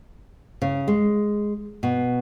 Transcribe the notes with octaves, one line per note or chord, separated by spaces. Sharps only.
C#3
G#3
B2